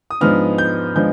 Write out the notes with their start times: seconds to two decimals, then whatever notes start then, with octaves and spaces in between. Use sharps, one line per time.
0.11 D#6
0.21 G#2 F3 G#3 B3 D4 F6
0.58 G6
0.95 F3 G#3 B3 D4 G6